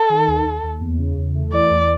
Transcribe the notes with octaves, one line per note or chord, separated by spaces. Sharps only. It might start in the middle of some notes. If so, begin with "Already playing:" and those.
Already playing: A4
D#3
D#2
D#2
D#2
E2
C#3
E2
A3
E3 D5
E2